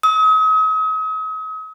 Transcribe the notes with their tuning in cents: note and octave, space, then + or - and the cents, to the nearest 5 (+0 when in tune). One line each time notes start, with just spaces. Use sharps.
D#6 +40